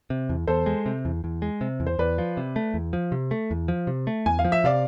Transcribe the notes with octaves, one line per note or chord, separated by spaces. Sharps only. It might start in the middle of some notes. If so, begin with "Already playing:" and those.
C3
E2
E2 A4 C5
G#3
C3
E2
E2
G#3
C3
E2
C5
E2 B4 D5
F3
C3
A3
E2
F3
C3
A3
E2
F3
C3
A3
E2 G#5
F5
F3
E5
C3 D5 F5